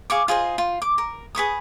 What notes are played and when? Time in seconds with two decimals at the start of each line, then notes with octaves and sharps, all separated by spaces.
0.10 G#4 F5 C#6 D6
0.28 F4 G#4 C5 D#5
0.58 F4
0.82 D6
0.98 A#4
1.35 G#4 B4 C#6 D#6